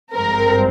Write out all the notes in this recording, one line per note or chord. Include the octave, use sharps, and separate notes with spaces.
G#1 G2 F3 G#3 C4 A#4